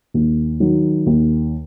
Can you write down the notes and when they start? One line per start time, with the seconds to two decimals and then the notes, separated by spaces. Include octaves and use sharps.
0.14 D#2
0.60 D#3 F#3
1.06 D#2